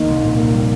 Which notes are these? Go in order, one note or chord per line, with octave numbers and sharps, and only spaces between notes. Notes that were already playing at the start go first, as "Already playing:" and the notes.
Already playing: D#2 D#3 A#3
C2
A#2
A#3
G3